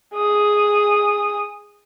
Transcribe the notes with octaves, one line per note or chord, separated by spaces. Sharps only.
G#4 D#6